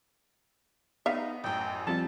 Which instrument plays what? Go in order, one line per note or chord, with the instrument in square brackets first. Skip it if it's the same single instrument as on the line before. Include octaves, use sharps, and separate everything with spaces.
[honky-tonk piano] B3 [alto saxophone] D#4 [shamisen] E5 F5
[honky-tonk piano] A1 F#2 [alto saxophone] G5
[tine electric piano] F3 C4 F4 [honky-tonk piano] G3 [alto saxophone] A5